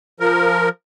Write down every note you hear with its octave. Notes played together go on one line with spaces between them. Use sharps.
F3 A#4